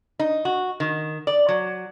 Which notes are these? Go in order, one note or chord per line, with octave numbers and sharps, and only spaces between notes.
D#4
F#4
D#3
D5
F#3